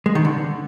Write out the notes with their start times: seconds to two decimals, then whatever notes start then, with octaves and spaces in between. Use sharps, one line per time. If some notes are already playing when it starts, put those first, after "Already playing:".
0.06 G#3
0.15 D#3
0.25 D3